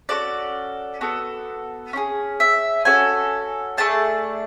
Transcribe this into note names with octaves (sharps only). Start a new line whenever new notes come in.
C#4 F#4 A4 D5
B3 F#4 A4
C#4 E4 G#4
E5
C#4 F#4 A4 G#5
A3 D4 G#4 A5